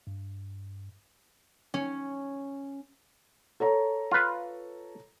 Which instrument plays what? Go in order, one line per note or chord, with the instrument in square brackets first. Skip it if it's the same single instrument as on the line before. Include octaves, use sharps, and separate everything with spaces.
[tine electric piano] G2
[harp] C#4
[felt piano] A4 C#5 A#5
[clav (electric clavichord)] F4 B4